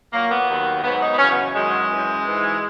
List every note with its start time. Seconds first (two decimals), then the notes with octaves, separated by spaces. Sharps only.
0.13 A#2 F#3 A#3
0.30 B3
0.48 D#2 D#3 F#3
0.83 G#2 F#3 B3
1.01 D#4
1.12 B3
1.18 F#2 C#3 E3 C#4
1.31 B3
1.55 F#2 D#3 F#3 G#3
1.89 F#2 E3
2.25 G#2 E3